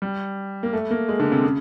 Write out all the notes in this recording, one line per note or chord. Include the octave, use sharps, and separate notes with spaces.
G3
A#3
A3
A#3
G#3
D3
C3
C#3